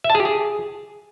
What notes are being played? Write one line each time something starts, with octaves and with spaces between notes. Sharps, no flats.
E5
A5
G#4
G4
G#4